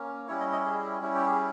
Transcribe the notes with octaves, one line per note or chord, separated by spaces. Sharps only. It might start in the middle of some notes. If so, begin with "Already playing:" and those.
Already playing: A#3 C#4
G3 C#4 E4 C#5
D#5
D#5
G#4
G3 C#4 E4
G4
G#4